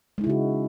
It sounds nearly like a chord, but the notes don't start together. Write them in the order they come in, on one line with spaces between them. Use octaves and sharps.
G#3 D#4 E4 C#3 F#4